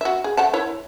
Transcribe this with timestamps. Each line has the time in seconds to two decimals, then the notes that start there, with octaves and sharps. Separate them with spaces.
0.01 F#4 E5
0.24 G#4
0.37 A3 F#5 A5
0.54 E4 C#5